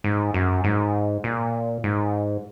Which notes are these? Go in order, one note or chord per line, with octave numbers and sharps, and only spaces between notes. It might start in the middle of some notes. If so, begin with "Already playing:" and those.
G#2
F#2
G#2
A#2
G#2